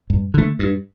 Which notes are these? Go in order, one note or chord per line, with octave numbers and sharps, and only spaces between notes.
G2
D3 A3
G2